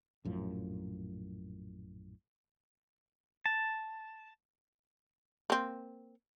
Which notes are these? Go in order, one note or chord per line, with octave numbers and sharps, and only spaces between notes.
A#1 F#2 A2 F3
A5
A#3 C4